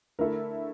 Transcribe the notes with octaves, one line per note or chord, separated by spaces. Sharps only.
D3 A3 E4 A4 A#4